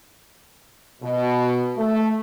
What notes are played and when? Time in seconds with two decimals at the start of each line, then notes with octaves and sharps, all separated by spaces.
1.02 B2
1.76 A3